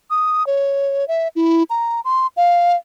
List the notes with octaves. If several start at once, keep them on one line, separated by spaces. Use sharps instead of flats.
D#6
C#5
E5
E4
A#5
C6
F5